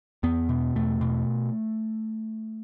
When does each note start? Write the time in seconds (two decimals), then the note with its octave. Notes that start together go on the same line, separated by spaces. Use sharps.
0.23 E2 B3
0.49 B2
0.76 E2 A3
1.01 B2